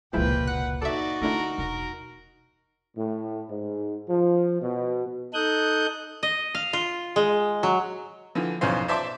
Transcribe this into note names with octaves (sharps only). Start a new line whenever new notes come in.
F1 C#2 A#2 F3 G#3 E4 B4 G5
F#5 F#6
D#4 F#4 A4 D5 E5
D3 A3 D4 E4 A#4
E1 A#4
A2
G#2
F3
B2
D#4 A4 D#6 F#6 G6
D#5
F5
F4
G#3
F#3
D3 E3 F3
B1 F2 E3 C#4 C5 F5
C5 D5 E5 A5 C6 D6